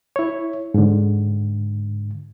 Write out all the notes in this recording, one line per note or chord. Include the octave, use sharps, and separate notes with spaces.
E4 C#5
G#2 D3